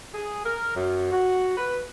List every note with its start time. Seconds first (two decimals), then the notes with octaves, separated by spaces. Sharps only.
0.15 G#4
0.45 A#4
0.75 F#2
1.12 F#4
1.57 B4